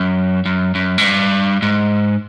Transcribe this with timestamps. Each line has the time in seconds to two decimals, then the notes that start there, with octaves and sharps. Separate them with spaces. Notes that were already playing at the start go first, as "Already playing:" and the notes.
Already playing: F#2
0.46 F#2
0.75 F#2
0.98 G#2
1.04 G2
1.62 G#2